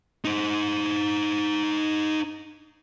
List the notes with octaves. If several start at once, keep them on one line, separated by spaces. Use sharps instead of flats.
D#4 C5